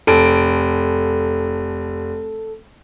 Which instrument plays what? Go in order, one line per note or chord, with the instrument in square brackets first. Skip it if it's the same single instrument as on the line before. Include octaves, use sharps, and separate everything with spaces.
[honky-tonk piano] F1 D7 [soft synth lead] A4